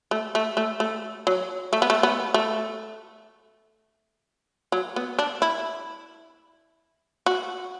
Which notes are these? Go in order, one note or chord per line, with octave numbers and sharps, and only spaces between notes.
A3
A3
A3
A3
F#3
A3
B3
A3
B3
A3
F#3
B3
D4
E4
F#4